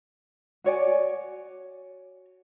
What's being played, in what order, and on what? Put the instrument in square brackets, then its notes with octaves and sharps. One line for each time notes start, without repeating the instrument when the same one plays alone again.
[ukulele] F#4 C#5 D5 G#5